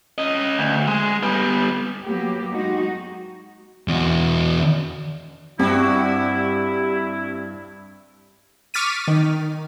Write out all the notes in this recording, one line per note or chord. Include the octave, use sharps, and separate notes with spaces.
C#4 D#5
D2
G#3
G3 B3
F#3 A#3 B3 G4
G#3 D#4 F#4
E2 F#4
G2 C4 E4 F#4 G4
C#6 D6 F6 A6 B6 D#7
D#3